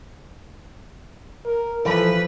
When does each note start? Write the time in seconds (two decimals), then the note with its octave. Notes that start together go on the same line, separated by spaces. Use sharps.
1.45 A#4
1.85 E3 F3 A4 B4